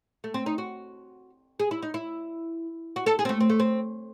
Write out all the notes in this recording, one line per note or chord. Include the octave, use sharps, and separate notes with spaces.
A3
C4
D#4
F#4
G#4
E4
D#4
E4
F#4
A4
G#4
C4
A3
C4
A3
C4